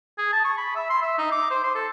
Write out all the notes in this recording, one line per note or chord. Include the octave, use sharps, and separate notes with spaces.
G#4
A5
C#6
B5
E5
C6
E5
D#4
D6
C5
C6
A4